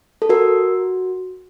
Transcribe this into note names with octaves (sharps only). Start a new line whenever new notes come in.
A4
F#4 A#4